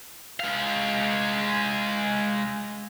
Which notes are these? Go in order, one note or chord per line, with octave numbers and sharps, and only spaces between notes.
G#3 F5